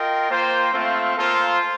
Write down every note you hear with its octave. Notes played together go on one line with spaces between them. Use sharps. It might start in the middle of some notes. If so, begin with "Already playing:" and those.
Already playing: F4 A#4 D#5 G5
A#3 F4 C5 G5
A3 C4 F4 C5 F5
A#3 F4 A4 C5 F5